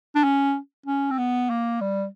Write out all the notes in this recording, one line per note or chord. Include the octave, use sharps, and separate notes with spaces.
D4
C#4
C#4
C4
B3
A#3
G3